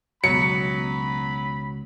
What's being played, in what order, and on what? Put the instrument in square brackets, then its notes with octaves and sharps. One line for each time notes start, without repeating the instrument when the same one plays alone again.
[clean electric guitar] C#2 B2 [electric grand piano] F#3 [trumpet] B5 [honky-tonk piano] C#7